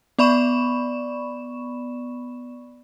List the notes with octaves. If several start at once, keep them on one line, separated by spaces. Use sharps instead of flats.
B3 D5 B5 C#6 E7